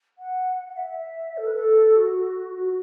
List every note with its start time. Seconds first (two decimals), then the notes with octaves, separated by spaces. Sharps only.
0.18 F#5
0.68 F#5
0.77 E5
1.37 A4
1.46 B4
1.55 A4
1.96 F#4
2.55 F#4